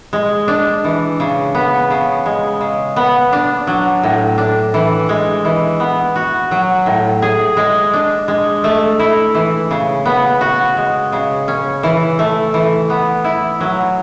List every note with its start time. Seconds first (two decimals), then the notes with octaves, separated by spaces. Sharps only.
0.13 G#3
0.48 D4
0.84 E3
1.20 C#3
1.55 B3
1.90 C#3
2.26 G#3
2.61 C#3
2.96 B3
3.32 D4
3.67 F#3
4.03 A2
4.38 D4
4.74 E3
5.09 G#3
5.45 E3
5.80 B3
6.16 F#4
6.51 F#3
6.86 A2
7.22 G#4
7.57 G#3
7.93 D4
8.28 G#3
8.64 A3
8.99 E4
9.35 E3
9.71 C#3
10.05 B3
10.41 F#4
10.77 G#3
11.12 C#3
11.48 C#4
11.83 E3
12.19 A3
12.54 E3
12.90 B3
13.24 E4
13.61 F#3